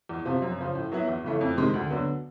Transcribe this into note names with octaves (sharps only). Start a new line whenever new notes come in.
E2
C3 F3
F#2
C#3 F3
A2
F#3 B3 E4
E2
C#3 E3 A3
F2
C3 D#3 G#3
D2
D3 F#3 B3